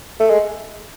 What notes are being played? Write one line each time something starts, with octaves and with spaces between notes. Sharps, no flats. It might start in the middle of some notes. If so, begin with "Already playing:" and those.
A3
G#3